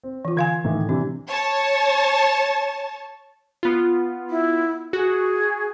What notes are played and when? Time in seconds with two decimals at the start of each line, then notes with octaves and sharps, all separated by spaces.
0.04 C4
0.25 E3 F4
0.37 D3 F5 G#5 C6 G#6
0.64 A2 D#3 E3
0.89 C3 E3 G3 D4
1.28 C#5 A5
3.63 B3 F4
4.30 E4
4.93 F#4 G#4